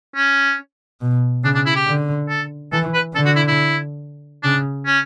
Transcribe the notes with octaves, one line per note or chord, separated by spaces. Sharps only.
C#4
B2
C#3 D4
D4
E4
G4
D3
A4
E3 A4
B4
D3 A4
F#4
E4
E4
C#3 D4
C#4